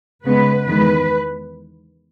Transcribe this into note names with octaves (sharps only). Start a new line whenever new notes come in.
C#3 G#3 B3 B4
E2 D#3 G#3 B4